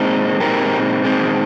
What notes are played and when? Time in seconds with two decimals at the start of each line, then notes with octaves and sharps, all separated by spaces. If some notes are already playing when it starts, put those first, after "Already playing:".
Already playing: A#2 G#3 C4 D#4
0.40 A#2 G#3 C4 D#4 G4 A#4
1.03 A#2 G#3 C4 D#4